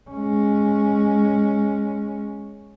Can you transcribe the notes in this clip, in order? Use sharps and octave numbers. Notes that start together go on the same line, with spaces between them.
G#3 C#4